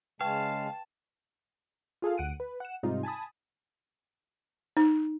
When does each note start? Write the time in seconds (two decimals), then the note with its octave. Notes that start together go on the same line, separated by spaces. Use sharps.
0.21 C#3 G#3 B4 F5 G5 A5
2.02 F4 G#4 A4 F5
2.18 D2 F#5 D7 D#7
2.40 B4
2.60 F#5 E7
2.83 G#2 C3 G3 D#4 F4
3.03 G#5 A5 B5 D#6
4.77 D#4